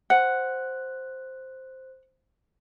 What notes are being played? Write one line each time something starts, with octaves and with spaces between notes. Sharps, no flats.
C5 F#5 F#6